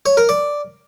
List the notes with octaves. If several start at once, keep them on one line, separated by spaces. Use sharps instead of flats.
C#5
A#4
D5